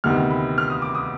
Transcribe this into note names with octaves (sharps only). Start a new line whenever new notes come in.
D2 C3 D#3 B3 F6
B5
F6
D#6
D6
D#6